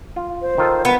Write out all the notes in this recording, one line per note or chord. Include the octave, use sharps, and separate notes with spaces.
F4
C5
D#3 F4 A4
B3 B4